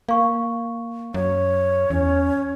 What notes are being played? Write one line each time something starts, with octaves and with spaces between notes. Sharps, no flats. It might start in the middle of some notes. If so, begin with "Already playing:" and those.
A#3 F5 C#6
F#2 C#5
E2 C#4